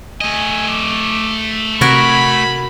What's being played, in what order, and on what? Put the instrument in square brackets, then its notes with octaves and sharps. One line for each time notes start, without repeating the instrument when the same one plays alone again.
[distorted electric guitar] A3 D#5 [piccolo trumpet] G#5
[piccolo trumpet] D6
[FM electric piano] C3 G#6 [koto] F#4 A#4 [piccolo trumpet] B5